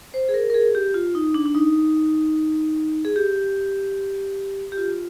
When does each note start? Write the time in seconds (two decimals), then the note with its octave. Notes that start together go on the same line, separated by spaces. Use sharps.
0.14 C5
0.29 G#4
0.34 A#4
0.50 A#4
0.54 G#4
0.75 G4
0.94 F4
1.15 D#4
1.34 D4
1.46 D4
1.55 D#4
3.05 G#4
3.16 G4
4.72 G4
4.77 F4